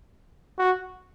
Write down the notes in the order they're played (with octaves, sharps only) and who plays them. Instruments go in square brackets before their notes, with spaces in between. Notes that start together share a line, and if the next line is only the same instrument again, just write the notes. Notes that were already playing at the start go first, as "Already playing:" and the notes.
[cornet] F#4